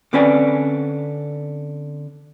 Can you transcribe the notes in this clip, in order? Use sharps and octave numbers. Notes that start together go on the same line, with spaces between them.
D3 C4 C#4 B4 D5 G#5